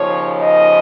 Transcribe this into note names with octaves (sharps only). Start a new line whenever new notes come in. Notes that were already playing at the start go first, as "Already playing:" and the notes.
Already playing: D#2 C#3 F3 C#5
D#5